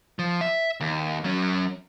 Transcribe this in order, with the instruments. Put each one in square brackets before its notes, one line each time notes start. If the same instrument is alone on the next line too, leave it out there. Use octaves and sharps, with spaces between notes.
[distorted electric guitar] F3
E5
D#2
F#3 C#4